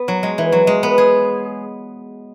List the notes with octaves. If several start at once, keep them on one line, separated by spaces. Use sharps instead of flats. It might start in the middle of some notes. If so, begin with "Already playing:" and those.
Already playing: B3
F#3
G#3
E3
F#3
G#3
B3
G#4